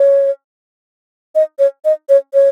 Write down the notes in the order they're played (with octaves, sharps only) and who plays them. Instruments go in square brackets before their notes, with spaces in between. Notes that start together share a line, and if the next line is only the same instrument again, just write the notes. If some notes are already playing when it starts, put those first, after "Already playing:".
Already playing: [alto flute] C#5
D#5
C#5
D#5
C#5
C#5